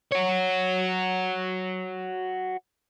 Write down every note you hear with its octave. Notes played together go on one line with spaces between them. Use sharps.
F#4 C#5